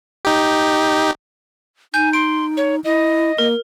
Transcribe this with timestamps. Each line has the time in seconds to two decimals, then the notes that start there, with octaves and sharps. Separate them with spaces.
0.25 D#4 G4
1.94 D#4 G#5 G6
2.13 C6 D7
2.57 C#5
2.84 E4 D#5
3.38 A#3 A#4